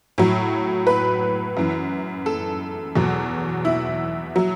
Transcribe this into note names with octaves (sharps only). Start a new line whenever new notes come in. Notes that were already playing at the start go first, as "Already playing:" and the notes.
A2 F#3
B4
F#2 E3
A4
E2 B2 F#3
E4
F#3